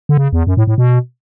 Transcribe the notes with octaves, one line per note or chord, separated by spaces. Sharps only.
D3
C#3
E2
F#2
A2
A2
B2